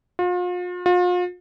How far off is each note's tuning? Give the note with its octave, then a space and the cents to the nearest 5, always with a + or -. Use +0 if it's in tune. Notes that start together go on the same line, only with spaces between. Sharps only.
F4 +40
F4 +40